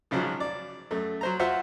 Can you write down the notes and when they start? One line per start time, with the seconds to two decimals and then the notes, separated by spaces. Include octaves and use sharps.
0.11 G#1 C#3 F3 F#3
0.40 D5
0.91 F#2 A3
1.21 F#3 C5 A#5
1.39 F4 F#4 C5 E5 F#5